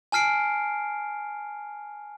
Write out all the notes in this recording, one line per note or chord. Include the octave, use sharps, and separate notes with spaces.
G#5 A5 F6 C7 D7